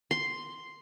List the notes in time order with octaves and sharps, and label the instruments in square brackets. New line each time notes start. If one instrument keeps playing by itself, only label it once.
[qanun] C6